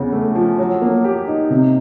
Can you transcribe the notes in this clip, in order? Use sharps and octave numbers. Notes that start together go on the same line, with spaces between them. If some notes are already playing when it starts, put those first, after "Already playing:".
Already playing: E2 C#3
A3
F3
F#3
A#3
G4
D#4
C3